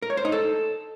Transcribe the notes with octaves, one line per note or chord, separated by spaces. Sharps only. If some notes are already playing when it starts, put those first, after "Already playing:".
A#4
C#5
C5
D#4
A4